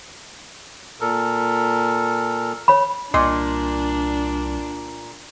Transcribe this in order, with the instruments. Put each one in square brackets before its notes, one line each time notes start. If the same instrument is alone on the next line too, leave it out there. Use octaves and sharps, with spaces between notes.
[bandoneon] A#2 A4 A#4
[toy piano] C#5 B5
[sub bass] C2 [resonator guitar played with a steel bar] A#2 [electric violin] D4 [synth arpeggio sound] D#5 C6